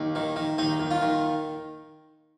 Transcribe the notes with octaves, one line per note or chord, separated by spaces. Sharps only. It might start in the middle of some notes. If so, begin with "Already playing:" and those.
Already playing: D#2
D#3
D#3
D#2 D#4
D#2
F4
D#3